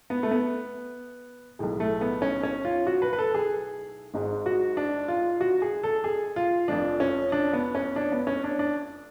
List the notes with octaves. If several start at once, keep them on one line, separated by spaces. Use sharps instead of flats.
B3
A3
B3
B1 A2 G#3
A3
B3
C#4
C#4
F4
F#4
B4
B4
A4
G#4
G#1 G#2 G#3
F#4
D4
F4
F#4
G#4
A4
G#4
F4
F1 F2 F3 D4
C#4
D4
B3
C#4
D4
B3
C#4
D4
D4